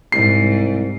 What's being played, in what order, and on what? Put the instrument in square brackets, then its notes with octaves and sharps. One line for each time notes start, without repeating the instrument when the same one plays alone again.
[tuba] C2 [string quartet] G#2 [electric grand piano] C7